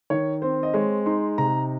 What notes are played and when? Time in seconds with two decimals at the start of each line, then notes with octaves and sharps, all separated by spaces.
0.10 D#3 C#5
0.42 C4 C5
0.63 D#5
0.74 G#3 C#5
1.06 D#4 C6
1.38 C3 A#5